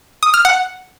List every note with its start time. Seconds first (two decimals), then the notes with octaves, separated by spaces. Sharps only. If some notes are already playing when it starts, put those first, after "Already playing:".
0.23 D#6
0.34 F6
0.45 F#5